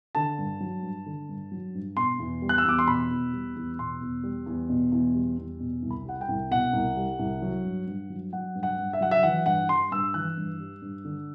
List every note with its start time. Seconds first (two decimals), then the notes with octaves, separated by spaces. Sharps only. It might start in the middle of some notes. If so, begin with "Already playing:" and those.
0.15 D3 A5
0.38 G2
0.60 F#3
0.83 G2
1.06 D3
1.29 G2
1.52 F#3
1.75 G2
1.96 B2 C6
2.19 E2
2.42 G3
2.49 F#6
2.58 E6
2.65 E2 D6
2.79 C6
2.87 B2 B5
3.10 E2
3.33 G3
3.56 E2
3.78 B2 C6
4.01 E2
4.23 G3
4.46 E2
4.69 B2
4.92 E2
5.14 G3
5.38 E2
5.60 B2
5.82 C2
5.90 B5
6.05 G3 F#5
6.21 G5
6.28 C2
6.51 B2 F#5
6.73 C2
6.97 G3
7.19 C2
7.42 F#3
7.64 G2
7.87 G2
8.10 F#3
8.33 F#3 F#5
8.55 G2
8.63 F#5
8.78 G2
8.93 E5
9.01 F#3 F#5
9.11 E5
9.23 E3 F#5
9.46 G2 F#5
9.68 G3 C6
9.91 G2 E6
10.14 E3 F#6
10.37 G2
10.60 G3
10.82 G2
11.05 D3